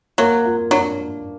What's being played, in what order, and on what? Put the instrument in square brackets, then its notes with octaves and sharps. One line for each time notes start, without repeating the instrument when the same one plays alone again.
[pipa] F#3 [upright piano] A#3
[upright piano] F4
[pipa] F#3 [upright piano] D4